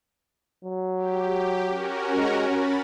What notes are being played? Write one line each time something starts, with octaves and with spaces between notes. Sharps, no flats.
F#3
G4
C#4 F#4 A#4
G#3
C#4 B5 A6